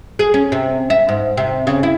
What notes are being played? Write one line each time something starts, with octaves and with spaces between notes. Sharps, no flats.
G#4
C#4
C3
E5
G#2
C3
C#3
E4